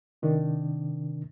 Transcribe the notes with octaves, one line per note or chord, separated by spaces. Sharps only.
C3 D#3 D4